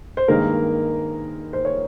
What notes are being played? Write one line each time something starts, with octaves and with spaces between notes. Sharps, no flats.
C5
G2 D#3 G#3 A#3 A#4
C5
C#5